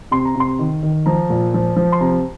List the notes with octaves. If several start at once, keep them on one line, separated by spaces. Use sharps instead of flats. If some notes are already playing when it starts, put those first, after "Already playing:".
C3 C6
A#5
C3 C6
D#3
D#3
F3 A#5
A#2
F3
F3
C6
C3 A#5